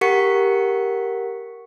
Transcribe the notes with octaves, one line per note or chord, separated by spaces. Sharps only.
G4 A#4 F#5 C#6 B6 C#7